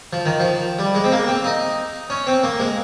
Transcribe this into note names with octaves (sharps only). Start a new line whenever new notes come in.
F3
D#3
F3
G3
G#3
C4
A#3
C4
D#4
C#4
C4
A#3
G#3